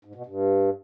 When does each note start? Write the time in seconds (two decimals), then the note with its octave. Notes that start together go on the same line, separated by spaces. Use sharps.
0.05 G#2
0.15 B2
0.26 G2